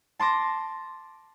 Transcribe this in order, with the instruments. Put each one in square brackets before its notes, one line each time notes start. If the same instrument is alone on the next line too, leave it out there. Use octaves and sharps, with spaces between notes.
[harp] A5 C6 D6 A#6